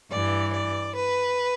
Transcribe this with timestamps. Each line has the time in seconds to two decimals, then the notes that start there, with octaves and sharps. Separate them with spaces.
0.11 G2 E3 D5
0.53 D5
0.95 B4